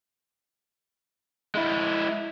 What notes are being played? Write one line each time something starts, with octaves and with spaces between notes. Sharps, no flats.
G#3 E4